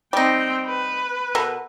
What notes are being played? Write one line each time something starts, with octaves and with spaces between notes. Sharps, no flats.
G3 C4 D#4 G5
B4
B2 A4 A#4